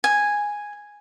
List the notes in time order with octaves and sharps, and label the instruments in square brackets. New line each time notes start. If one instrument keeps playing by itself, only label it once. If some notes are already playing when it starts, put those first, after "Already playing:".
[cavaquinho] G#5